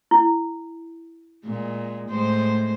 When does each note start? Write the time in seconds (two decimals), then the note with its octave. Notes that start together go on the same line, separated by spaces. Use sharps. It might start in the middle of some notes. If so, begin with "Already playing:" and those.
0.11 E4
1.45 A#2 G#3
2.09 A2 G#3 C5